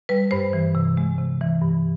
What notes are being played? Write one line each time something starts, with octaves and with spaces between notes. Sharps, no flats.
G3 B4
G2 C5
E3
C3
G#3
C3
E3
G2